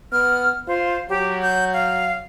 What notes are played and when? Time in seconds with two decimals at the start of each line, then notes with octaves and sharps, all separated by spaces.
0.12 B3 F6
0.67 F4 C5
1.09 F#3 G4
1.42 G6
1.73 F5